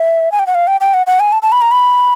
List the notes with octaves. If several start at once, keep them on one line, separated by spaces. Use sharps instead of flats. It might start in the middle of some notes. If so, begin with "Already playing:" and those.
Already playing: E5
G#5
G5
F#5
F5
G5
G5
F#5
F#5
G#5
A5
A5
B5
A#5
B5